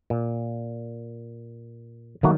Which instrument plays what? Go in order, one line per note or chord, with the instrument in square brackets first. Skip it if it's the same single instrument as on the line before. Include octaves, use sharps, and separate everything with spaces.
[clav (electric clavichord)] A#2
[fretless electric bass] D#3 F#3 [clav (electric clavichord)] A3 A#3 F#4